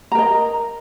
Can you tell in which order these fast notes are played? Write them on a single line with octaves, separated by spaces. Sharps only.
A#5 A#4 D#5